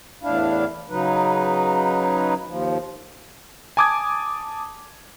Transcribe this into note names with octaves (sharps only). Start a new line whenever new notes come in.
E2 A2 D4 E4 F5
C#3 F#3 D#4 B4
D#2 F3
G#5 A5 D6 D#6 G#6